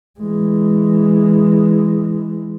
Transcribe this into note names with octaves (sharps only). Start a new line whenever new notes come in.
E3 G#3